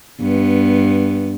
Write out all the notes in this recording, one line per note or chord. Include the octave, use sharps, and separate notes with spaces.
G2 B3